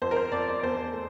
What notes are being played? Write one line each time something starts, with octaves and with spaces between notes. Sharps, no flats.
F2 C5
A#4
C5
F2 D5
D5
E2 C5
A3